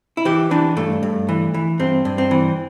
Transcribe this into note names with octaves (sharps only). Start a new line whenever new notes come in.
E4
E3 G4
E3 D4
G2 A3
G2
E3
E3
G2 C4
G2
C4
E3